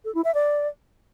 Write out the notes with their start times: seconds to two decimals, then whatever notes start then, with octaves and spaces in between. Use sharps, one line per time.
0.05 A4
0.15 E4
0.25 E5
0.34 D5